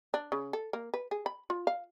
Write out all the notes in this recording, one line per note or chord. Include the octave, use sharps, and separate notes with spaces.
D4
C#3
A4
A#3
B4
G#4
B5
F4
F5